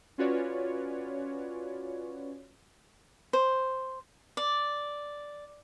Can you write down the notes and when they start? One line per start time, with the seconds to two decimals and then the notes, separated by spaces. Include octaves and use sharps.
0.18 C#4 F4 F#4 B4 C#5 D5
3.33 C5
4.37 D5